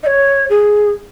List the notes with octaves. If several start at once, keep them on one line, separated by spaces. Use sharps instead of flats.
D#5
C#5
G#4